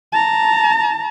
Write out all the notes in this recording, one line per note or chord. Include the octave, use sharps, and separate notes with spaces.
A5 A#5